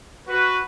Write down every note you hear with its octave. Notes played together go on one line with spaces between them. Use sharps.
F#4 B4